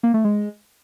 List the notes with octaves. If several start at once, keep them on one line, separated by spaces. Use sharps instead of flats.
A#3
A3
G#3